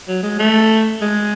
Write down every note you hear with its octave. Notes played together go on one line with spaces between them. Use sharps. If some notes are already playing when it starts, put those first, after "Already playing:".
F#3
G#3
A3
G#3